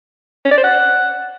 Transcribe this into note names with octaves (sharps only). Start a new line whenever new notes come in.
C#4
D5
C5
F#5